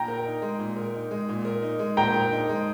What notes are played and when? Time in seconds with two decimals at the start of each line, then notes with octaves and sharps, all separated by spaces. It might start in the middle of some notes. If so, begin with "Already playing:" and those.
Already playing: A#2 G5 A#5
0.08 A#4
0.25 D#4
0.42 G#3
0.59 A#2
0.76 A#4
0.94 D#4
1.11 G#3
1.29 A#2
1.45 A#4
1.62 D#4
1.79 G#3
1.97 A#2 G5 A#5
2.14 A#4
2.32 D#4
2.49 G#3